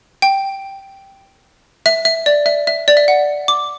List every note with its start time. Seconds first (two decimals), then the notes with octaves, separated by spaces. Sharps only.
0.22 G5
1.86 E5
2.05 E5
2.26 D5
2.46 E5
2.67 E5
2.88 D5
2.97 E5
3.08 F#5
3.48 D6